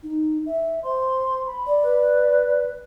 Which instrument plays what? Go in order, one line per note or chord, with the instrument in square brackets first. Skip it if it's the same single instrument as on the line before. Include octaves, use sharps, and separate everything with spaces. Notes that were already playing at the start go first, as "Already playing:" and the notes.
[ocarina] D#4
E5
[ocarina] C5 [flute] C6
[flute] B5
[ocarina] D5
[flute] B4